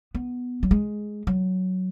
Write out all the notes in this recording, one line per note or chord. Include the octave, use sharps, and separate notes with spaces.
B3
F#3
G#3
F#3